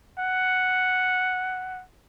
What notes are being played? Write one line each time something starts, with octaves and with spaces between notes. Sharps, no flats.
F#5